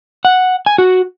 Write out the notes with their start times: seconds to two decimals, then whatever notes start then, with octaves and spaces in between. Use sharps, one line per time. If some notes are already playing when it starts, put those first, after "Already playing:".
0.25 F#5
0.66 G#5
0.78 F#4